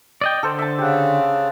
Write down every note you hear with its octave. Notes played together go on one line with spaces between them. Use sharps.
D5 D#5 G5
D3 A4 C5
E5 A5
C#3 G4 F#5